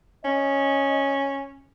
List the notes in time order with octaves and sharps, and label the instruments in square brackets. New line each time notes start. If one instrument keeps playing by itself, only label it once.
[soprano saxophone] C#4 [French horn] D#5